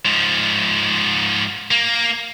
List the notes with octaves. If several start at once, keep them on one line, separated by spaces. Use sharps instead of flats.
G#2 F3
A#3